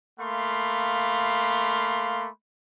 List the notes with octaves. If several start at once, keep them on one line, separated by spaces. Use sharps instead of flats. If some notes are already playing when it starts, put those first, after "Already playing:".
A3 A#3 F5 B5 C6